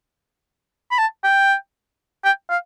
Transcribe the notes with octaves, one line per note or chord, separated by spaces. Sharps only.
B5
A5
G5
G5
F5